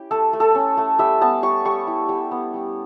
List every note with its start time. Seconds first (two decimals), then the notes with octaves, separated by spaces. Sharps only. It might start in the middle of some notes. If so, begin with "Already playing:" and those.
Already playing: C#4 E4 G4
0.11 A3 A4
0.33 A3
0.40 A4
0.55 C#4
0.77 A3
0.99 G3 E5
1.21 B3 A5
1.43 G3 C#6
1.65 G3 C#6
1.87 E4
2.09 G3
2.31 B3
2.54 G3